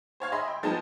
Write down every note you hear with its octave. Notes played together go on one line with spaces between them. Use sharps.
C5 C#5 F5 G#6
G#4 D#5 E5 B5 C6
G5
F3 G#3 B3 D#4 A5